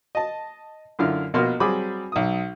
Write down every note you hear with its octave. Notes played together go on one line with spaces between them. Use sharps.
D#5 A5
F#2 D3 E4 F4 F6
A#1 B2 A#3 C6 F6
F#3 G3 C4 G#4 B5 D6
B1 D#6